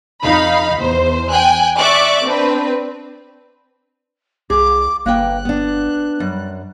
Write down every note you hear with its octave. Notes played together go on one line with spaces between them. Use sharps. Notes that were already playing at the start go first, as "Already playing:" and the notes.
F2 D#4 F5 B5
E2 C5
G5 G#5 F#6
D5 E5 C#6 D6 F#6
C4 D4 B4
C2 G#4 D6
G1 A#3 B4 G5 F#6
B3 D4
F#2 G3